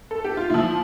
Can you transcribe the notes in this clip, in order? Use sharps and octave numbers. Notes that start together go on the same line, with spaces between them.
A4
G4
F4
A#2 F3 E4